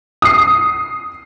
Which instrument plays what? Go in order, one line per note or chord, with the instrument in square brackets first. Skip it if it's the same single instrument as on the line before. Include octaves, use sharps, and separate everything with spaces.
[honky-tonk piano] D#6 C7